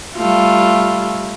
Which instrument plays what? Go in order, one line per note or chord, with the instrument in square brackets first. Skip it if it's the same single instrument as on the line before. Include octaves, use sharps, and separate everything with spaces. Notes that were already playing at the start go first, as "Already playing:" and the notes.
[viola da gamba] G3 A3 F4